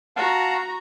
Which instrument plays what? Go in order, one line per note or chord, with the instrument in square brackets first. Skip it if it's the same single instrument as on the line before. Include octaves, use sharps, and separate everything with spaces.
[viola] F#4 A#5 [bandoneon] F5 F#5 A5